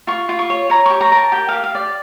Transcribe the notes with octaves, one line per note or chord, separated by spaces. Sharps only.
F4 C#6
F4
C#6
C#5
C#5 A#5
G4 C#6
A#5
A#4
A5
G4 G5
G4 F5
F5
D5